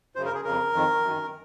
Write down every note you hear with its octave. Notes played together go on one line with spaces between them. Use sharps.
F#2 C#3 C5
A#4
G#4
F2 C#3 A#4
F2 D#3
F#2
D#3